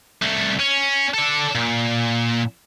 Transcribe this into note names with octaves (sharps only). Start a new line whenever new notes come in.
C2 A3
C#4
A4 D5
A#2